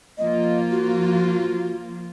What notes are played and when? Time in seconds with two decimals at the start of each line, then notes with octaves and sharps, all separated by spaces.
0.18 F3 A#3 F4 D#5
0.71 F#4